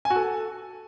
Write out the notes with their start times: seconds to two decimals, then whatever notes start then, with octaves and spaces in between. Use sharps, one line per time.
0.05 G#5
0.10 F#4
0.16 A4